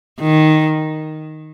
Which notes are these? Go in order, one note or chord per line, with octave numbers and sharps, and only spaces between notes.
D#3